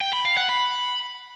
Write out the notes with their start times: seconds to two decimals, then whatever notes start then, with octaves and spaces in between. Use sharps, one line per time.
0.01 G5
0.13 B5
0.25 F5
0.37 F#5
0.49 B5